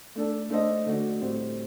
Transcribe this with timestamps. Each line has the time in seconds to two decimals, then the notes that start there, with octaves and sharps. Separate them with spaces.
0.15 A3 D4 A4
0.50 A3 D4 A4 C5 D#5
0.86 D3 A3 D4 F#4
1.21 A2 G3 C4